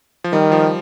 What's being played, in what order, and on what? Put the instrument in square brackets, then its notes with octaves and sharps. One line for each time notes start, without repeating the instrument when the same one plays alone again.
[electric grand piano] F3
[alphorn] D#3 [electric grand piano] G3
[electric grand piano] F3